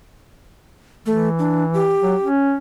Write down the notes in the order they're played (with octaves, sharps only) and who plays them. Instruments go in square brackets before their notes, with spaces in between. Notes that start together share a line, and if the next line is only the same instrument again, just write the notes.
[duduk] E3 [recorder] A3
[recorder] D4
G4
[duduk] F#3
C#4